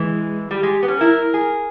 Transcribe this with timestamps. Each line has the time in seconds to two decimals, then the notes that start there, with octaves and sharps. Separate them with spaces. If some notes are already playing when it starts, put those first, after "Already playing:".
Already playing: E3 G#3
0.51 G3 G4
0.63 G#3
0.83 B3
0.88 C#4
1.01 E4 A#4
1.34 G#4